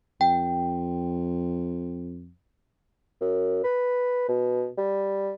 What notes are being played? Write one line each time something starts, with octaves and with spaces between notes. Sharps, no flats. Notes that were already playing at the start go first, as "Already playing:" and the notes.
F2 G5
F#2
B4
B2
G3